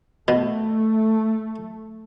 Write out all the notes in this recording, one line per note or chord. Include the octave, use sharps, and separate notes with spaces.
B2 A3